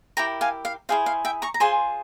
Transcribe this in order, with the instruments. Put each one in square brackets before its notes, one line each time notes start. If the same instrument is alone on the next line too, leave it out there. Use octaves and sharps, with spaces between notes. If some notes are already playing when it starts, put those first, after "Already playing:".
[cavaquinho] E4 G4 A#4 G5 A#5
F5 G#5
F5
E4 G#4 C5 F5
F5
E5 G5
A#5 C#6
A#5
F4 G#4 C5 G#5 C6